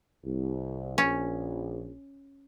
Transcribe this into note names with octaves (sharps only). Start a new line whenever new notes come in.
C2
A#1 C#4